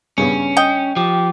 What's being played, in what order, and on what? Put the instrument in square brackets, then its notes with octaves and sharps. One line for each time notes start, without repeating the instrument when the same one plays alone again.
[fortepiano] G2 C#3 B3 [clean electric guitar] C#4
[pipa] D#5 G5
[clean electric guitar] F3 [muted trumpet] G4